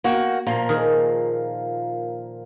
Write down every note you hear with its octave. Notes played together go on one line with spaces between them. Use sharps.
A#3 F#4 G5
A#2 F3 A#3
D#3 G#4